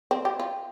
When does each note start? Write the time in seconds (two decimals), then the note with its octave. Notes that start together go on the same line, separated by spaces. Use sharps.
0.11 C4
0.25 G4
0.40 F4